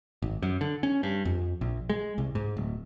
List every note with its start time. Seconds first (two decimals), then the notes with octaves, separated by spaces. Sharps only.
0.22 G#1
0.42 F#2
0.61 D3
0.83 C#4
1.03 G2
1.25 F2
1.61 A#1
1.90 G#3
2.18 C2
2.35 G#2
2.57 D1